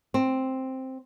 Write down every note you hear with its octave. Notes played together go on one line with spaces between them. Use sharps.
C4